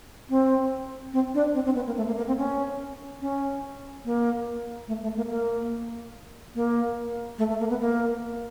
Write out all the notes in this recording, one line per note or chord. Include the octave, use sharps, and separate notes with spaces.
C4
C4
D4
C4
C4
B3
A#3
A3
A#3
A#3
C4
C#4
C#4
A#3
A3
A3
A#3
A#3
A#3
A3
A3
A#3
B3
A#3